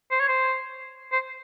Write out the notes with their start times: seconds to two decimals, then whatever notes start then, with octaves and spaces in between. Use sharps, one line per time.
0.11 C5
0.20 C#5
0.28 C5
1.12 C5